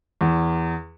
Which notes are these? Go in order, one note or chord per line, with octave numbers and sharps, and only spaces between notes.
E2